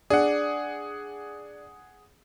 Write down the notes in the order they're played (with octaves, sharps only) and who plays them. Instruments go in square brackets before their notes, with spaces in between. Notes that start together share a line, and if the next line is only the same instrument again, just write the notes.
[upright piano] D4 [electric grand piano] G#4 F#5